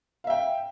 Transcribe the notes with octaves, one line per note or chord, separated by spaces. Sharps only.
E5 F5 G5